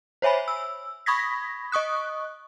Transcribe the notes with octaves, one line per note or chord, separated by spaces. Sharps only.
C5 C#5 E5 G#5 B5
E6
B5 C#6 D#6 G#6 A#6 B6
D#5 C#6 D#6 F#6